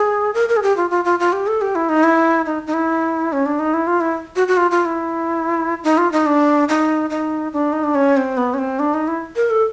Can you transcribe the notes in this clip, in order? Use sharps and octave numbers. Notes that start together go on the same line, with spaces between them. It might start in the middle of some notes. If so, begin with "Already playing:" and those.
Already playing: G#4
A#4
A#4
G#4
G4
F4
F4
F4
F4
G4
A4
G4
E4
D#4
E4
D#4
D#4
E4
C#4
D4
D#4
E4
F4
E4
F#4
F#4
F4
F4
E4
D#4
F4
D#4
D4
D#4
D#4
D4
D#4
D4
C#4
C4
B3
C#4
C4
D4
D#4
E4
A#4
A4